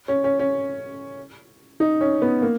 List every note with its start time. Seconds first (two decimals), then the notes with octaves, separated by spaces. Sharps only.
0.08 C#4
0.24 C#4
0.39 C#4
1.80 D#4
2.01 C#4
2.22 B3
2.42 A#3